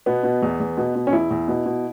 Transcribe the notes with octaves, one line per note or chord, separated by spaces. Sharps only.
B2 B3
B2
E2
E2
B2
B2
C#4
E2 E4
E2
B2
B2